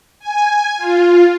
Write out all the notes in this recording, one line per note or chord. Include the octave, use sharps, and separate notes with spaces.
G#5
F4